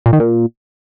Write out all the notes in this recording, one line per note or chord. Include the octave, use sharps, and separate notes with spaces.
A#2
D#3
A#2